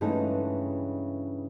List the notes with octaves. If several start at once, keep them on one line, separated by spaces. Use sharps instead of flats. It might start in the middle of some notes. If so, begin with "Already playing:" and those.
G2 C#3 E3 G#3 A3 D#4